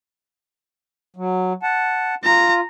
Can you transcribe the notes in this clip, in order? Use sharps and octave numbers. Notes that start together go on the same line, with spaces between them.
F#3
F#5 A5
F4 A#5